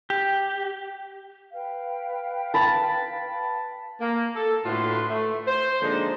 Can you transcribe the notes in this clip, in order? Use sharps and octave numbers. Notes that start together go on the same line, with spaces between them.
G4
B4 F5 G5
A5 B5
A#3
A4
A2 D3 F4 F#4 B4 C6
A3
C5
D3 F3 G#3 A#3 D4 D#4